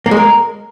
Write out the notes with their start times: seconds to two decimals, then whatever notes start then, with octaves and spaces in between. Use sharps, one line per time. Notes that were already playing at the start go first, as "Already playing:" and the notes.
0.06 A#3
0.11 G#3
0.17 A#4